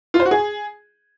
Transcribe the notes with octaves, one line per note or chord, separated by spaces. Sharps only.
F4
C5
F#4
G#4